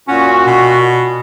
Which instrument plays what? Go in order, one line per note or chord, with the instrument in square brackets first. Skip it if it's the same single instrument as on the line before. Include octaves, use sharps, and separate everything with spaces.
[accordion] A#2 F#4 [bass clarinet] C#4
[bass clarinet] B2